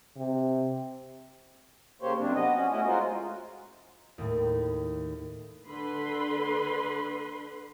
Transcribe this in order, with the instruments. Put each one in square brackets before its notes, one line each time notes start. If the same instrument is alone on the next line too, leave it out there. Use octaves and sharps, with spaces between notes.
[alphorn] C3
[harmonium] C#3 A#3 G4 C5 C#5
F#2 C3 C4 D4
B3 D#5
C#4 F#4
A3 C#4 E4 F#4 D#5
G#3 F4 F#4 A#4 C5
[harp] D#2 A2
[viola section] D3 B4 B5 C6